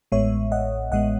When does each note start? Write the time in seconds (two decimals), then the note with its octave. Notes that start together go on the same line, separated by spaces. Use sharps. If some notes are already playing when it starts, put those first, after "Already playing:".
0.12 A1 A2 G#3 B3 C#5 E5
0.52 D#5 F#5
0.92 A1 A2 G#3 B3 D#5 F#5